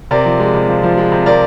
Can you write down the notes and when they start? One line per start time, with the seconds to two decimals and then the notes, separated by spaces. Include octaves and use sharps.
0.11 C3 A#4 D5
0.25 F3
0.40 G#3
0.54 C3
0.69 F3
0.83 F3
0.97 G#3
1.12 C3
1.26 F3 A#4 D5